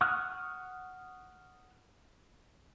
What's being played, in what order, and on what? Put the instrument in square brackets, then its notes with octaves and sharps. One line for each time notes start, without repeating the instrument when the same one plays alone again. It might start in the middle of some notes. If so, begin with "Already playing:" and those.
[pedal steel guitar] F#5 C#6 D#6 F6 F#6